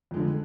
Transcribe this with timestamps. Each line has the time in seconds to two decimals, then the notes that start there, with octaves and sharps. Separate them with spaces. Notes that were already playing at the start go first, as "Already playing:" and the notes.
0.11 F2
0.14 G#3
0.17 D3